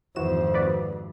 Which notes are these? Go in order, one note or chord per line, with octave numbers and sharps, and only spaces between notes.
G#1 F2 E3 F#4 C5 E7
F#4 B4 D5